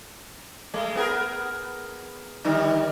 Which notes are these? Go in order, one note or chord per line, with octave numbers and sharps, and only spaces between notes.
G#3 A3
B3 G#4 A#4
D3 D#3 G3